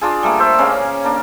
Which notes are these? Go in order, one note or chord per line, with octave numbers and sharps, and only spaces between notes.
D4 F4 G#4
G3 A3 A#3
C5 E5
C#3 A#3 C#4 F5
A#3 D4